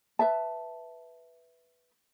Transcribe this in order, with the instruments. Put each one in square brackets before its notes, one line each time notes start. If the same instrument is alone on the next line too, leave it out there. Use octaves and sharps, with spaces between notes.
[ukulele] B4 E5 A5